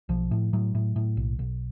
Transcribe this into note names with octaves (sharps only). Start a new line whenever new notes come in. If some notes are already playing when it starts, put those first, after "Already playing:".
B1 F3
A2
A2 F#3
A2
A2
B1
B1